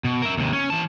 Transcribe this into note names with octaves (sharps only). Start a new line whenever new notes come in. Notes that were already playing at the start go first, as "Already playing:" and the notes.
B2
A#4 E5
D#2 C3
C#4
E3 A5